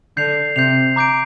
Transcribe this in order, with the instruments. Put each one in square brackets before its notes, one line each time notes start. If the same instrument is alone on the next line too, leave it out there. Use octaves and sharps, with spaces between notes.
[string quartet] D3 [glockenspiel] G6 C7 F7
[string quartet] C3 [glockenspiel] G6 C7 F7
[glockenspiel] A#5 D6 G6 D7